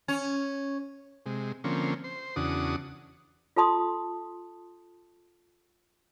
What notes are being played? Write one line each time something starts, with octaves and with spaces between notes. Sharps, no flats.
C#4 C#5
C3 G#3
D3 F3 A#3 C4 C#4
C5
E2 C#3 D4 F#4 D#6
F4 A4 A5 C6 D#6